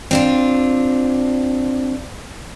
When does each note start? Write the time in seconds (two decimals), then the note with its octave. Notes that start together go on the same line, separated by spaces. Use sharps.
0.11 C4 D4 F4